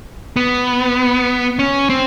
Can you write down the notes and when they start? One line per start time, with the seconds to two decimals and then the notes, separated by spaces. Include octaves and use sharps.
0.36 B3
1.59 C#4
1.90 C4